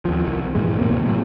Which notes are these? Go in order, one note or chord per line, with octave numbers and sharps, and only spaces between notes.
D#2 F3
C2
G2 A#2 E3 G#3
C#2 A2 C3 A#3
D#2 C3 A#3
A2 C3 F#3